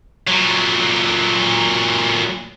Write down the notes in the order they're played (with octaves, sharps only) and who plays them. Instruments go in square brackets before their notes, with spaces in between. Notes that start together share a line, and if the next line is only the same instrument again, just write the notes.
[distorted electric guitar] A#2 F#3